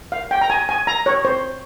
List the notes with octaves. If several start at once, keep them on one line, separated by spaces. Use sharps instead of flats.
F5
G5
A#5
G#5
G#5
A#5
C#5
C5